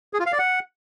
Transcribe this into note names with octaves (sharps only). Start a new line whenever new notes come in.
G#4
F4
F5
D5
F#5